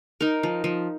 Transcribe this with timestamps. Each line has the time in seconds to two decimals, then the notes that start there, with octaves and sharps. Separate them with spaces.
0.21 D#4 A#4
0.43 F3
0.64 F3